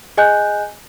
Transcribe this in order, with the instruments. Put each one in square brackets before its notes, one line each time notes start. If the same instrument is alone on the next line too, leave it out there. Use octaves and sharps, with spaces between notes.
[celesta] G#4 D#5 G#5 F#6 G6